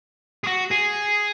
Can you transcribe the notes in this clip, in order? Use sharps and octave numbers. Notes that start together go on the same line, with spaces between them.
G#4
F#4
G#4